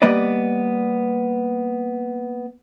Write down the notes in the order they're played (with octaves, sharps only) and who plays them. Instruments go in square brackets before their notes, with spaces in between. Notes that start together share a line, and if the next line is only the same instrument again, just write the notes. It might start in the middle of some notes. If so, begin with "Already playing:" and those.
[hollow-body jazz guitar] G3 A#3 B3 B4 D5 D#5